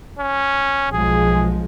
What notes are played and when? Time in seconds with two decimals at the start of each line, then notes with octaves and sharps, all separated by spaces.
0.19 C#4
0.92 B1 F3 G#3 G#4